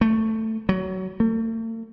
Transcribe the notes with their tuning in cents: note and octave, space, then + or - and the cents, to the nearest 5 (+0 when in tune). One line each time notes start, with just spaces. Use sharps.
A3 +10
F#3 +20
A3 +45